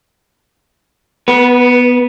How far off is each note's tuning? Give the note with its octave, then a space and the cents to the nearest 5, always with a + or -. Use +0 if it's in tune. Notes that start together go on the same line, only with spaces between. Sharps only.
B3 +0 B4 -30